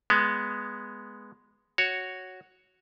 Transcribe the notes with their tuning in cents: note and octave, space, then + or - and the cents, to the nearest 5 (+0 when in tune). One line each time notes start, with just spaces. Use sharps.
G#3 +0 B3 +0
F#4 +0 C#5 +0